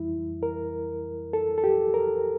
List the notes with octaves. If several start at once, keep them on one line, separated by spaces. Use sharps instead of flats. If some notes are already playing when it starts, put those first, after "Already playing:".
Already playing: F2 E3 G3 E4
A#4
A4
A4
G4
A#4